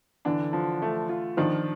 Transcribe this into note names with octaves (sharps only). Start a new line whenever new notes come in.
D3 E3 D4
F3
A3
F4
D#3 F3 D4